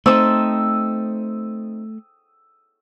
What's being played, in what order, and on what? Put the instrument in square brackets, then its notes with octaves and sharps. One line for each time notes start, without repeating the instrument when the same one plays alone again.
[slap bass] A3 [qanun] C4 D#4 A5 [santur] D#6 E6